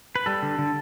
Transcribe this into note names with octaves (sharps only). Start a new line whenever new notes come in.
B4
G3 A4
D3
D3